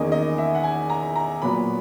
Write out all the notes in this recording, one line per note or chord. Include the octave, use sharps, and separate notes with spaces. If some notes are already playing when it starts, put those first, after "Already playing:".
Already playing: E2 D#3 A#3 C#4 D#5
D#5
E5
F#5
G#5
A#5
A#5
A#2 F#3 B3 B5